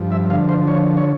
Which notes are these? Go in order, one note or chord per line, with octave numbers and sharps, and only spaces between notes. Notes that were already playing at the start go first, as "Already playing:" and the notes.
Already playing: G2 F3
E5
D3 F5
C5
F3 C#5
C#5